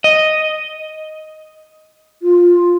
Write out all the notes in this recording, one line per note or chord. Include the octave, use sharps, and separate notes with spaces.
D#5
F4